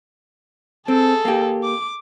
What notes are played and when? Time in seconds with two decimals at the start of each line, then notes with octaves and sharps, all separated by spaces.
0.88 C4 G#4 A4
1.25 A#3 G4
1.64 D6